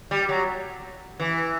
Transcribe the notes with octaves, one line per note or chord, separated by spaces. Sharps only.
G3
F#3
E3